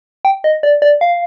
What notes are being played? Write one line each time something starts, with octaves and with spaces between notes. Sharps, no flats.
G5
D#5
D5
D5
F5